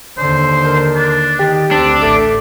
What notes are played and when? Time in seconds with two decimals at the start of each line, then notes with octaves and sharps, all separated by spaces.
0.18 D#2 D3 C5
0.66 A#4
0.95 D4
1.39 D#3 G4
1.71 D2 C4 D4 A4
2.02 A1 A3 D6